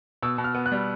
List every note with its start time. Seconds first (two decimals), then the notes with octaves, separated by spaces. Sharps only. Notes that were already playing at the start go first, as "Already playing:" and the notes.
0.22 B2 E6
0.38 B2
0.44 F6
0.55 B3
0.66 F#6
0.72 G3